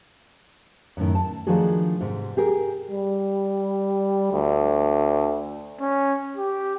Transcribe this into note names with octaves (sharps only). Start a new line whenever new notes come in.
F#2 A2 D#3
A5
D#3 F3 A3 D4 F#4 G#4
G#2 C3
G4 G#4 A#4
G3
D2
C#4
G4